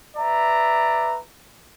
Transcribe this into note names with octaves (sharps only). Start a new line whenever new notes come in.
B4 D5 E5 A#5